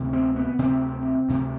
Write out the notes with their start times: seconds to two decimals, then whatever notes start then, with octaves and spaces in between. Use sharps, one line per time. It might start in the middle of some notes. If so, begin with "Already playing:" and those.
Already playing: D2 C3
0.13 C4
0.36 B3
0.59 D2 C3 C4
1.29 D2 C3